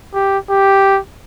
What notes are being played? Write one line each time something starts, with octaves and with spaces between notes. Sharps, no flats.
G4
G4